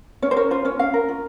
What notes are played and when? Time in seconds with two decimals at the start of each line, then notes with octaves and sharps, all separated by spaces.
0.22 C#4 C#5
0.31 C5
0.36 A#4 C#5
0.50 F4 C5
0.65 C#4 C#5
0.79 C#4 F5
0.94 A#4
1.09 F4